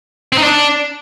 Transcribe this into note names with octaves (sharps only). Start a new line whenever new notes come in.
C4
D#4
D4